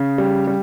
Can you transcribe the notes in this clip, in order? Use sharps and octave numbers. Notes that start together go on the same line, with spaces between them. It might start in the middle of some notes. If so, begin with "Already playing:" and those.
Already playing: C#3
G3
G3